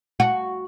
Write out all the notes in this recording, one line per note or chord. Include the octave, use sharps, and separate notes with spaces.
F#4